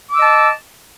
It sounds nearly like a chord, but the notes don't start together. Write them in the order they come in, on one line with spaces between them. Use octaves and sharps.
D6 E6 D#5 A5